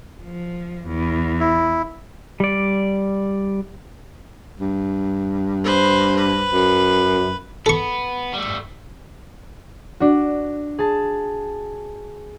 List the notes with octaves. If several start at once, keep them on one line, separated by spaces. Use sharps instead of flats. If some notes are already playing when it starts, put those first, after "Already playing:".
F3
E2
E4
G3 D5
G2
B4 C5
B4
F#2
B3 A4 C#6
G3 A3
D4 F#4
G#4 A5